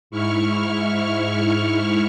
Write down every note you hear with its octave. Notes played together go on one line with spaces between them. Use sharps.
G#2 E4 C#6 F6